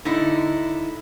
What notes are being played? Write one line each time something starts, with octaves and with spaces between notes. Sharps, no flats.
D3 D#4 E4